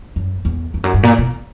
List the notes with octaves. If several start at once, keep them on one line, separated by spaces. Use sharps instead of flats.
F#2
E2
F2
F#2
G2
A#2
B2